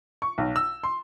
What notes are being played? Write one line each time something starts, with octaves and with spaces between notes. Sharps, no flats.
C#6
B1
E6
C6